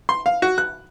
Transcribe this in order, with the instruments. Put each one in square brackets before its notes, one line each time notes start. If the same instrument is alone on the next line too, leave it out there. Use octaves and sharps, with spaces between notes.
[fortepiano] C6
F5
F#4
F#6